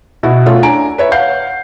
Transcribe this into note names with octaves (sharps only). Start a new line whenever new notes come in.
B2 E4 F#4
A3 C#4 F4
D4 G#5 A#5 D7
B4 C#5 E5
F5 F#5 G6 C7